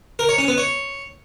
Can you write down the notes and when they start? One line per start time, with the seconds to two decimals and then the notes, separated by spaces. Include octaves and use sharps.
0.19 A#4
0.29 C#5
0.38 C#4
0.48 B3
0.58 C#5